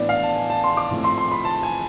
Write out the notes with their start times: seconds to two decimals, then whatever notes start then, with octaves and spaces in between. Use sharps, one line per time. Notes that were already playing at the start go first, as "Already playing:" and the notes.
Already playing: A2 E3 B3 D4 D5
0.09 F5
0.23 A5
0.36 G#5
0.50 A5
0.64 C6
0.77 D6
0.91 A2 F3 A3 C4
1.04 C6
1.18 C6
1.32 B5
1.45 A5
1.63 G#5